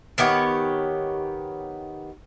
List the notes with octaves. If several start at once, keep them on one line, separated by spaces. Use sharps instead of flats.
D#3 B3 G4 C#5